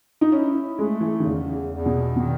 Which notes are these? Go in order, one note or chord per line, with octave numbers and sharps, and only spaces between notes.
D#4
C#4 E4
G#3 A3
E3
D#3
E2 C#3
E2
B2
B2 D#3